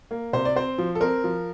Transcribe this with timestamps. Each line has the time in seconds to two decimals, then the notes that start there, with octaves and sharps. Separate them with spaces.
0.11 A#3
0.33 C3 C5
0.45 D5
0.56 C4 C5
0.78 F3
0.95 A4
1.01 C4 A#4
1.24 F3